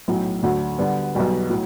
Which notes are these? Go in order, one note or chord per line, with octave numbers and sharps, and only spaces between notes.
B1 A2 F#3
D2 D3 F#3
D3 G3 B3
B1 B2 G3
A2 F#3